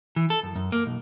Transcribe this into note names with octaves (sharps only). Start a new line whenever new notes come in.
E3
A4
F#2
F#2
A#3
B1